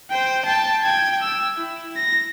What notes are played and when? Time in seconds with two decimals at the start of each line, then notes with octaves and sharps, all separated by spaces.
0.11 C5 G5
0.45 G5 A5
0.83 G5 G#6
1.22 E6
1.57 E4
1.97 A#6